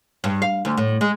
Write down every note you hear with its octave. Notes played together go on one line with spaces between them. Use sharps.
G2
F5
D2
A2
G#3